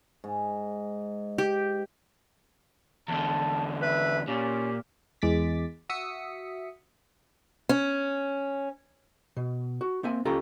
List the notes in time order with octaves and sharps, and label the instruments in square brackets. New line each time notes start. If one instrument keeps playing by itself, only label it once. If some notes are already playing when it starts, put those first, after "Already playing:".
[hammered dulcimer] G#2
[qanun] G4
[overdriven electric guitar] E2 D3 [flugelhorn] A5
[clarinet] B4 [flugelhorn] E5
[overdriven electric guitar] A#2 [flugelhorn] C#4 [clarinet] G4
[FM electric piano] E2 G#3 D6 A6 B6
F#4 E5 D#6 B6 C#7
[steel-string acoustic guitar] C#4
[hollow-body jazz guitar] B2
F#4
A#3 C4 E5 G#5
C#2 C#4 F4 G4 A4 A#5